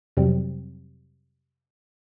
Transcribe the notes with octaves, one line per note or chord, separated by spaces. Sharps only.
F2 C3 F#3 G3 C4